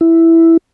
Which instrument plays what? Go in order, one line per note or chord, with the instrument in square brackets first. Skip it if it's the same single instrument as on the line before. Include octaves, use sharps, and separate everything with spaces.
[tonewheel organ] E4